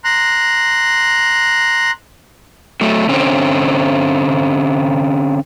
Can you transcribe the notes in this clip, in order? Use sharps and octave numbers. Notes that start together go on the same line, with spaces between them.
A#5 C6 F#6
F#3 A3
D3 C4 C#4